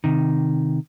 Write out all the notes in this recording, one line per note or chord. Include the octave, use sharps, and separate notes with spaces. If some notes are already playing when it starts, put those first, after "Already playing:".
C3 D#3